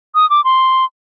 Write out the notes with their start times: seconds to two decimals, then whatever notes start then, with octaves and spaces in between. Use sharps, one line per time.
0.15 D#6
0.30 D6
0.44 C6